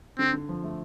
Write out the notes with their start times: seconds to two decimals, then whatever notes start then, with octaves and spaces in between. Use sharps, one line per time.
0.19 D3 C4
0.33 D3
0.49 F3
0.64 A3